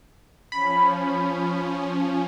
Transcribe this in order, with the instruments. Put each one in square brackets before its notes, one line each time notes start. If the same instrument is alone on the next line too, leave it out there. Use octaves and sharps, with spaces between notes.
[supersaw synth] F3 C#4 [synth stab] B5